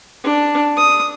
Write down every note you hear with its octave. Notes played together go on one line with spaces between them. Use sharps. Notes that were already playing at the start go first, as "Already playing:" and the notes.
D4
D#6